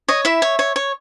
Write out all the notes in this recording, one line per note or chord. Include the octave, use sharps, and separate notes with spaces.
C#5 D#5
E4 E5
C#5
C#5
C#5